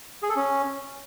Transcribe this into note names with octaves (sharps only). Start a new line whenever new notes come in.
G#4
A4
C#4